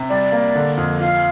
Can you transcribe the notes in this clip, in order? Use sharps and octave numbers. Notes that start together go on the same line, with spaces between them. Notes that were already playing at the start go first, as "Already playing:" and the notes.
Already playing: C3
G3 D5
A#3
D3
F2
F4 F5